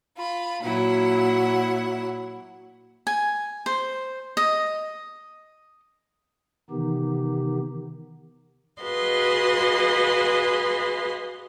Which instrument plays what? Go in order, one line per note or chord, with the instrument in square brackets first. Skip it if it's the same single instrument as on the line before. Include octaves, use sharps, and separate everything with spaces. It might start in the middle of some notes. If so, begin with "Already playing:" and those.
[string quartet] F4 B5
A#2 F#3 E4 F#5
[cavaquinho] G#5
C5
D#5
[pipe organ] C3 D#3 E3 B3 D#4 G4
[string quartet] F#4 G#4 B4 D#5 F5 C6